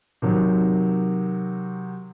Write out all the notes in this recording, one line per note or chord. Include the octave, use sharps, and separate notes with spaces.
C3 D#3 F#3